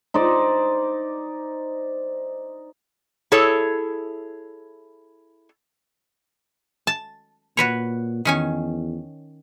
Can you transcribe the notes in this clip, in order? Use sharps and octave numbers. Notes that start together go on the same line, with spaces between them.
D#4 C5 D5
E4 G#4 A4 C#5
A5
A#2 F#4 B4 C#5
E2 D#3 C#4 G#5